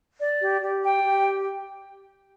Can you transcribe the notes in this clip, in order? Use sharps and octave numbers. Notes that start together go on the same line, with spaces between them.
D5
G4
G4
G5
G4